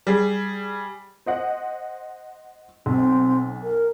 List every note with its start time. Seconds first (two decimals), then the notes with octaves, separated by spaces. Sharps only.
0.07 G3 G#4
1.26 C5 D#5 F#5
2.86 B1 C4
3.63 A#4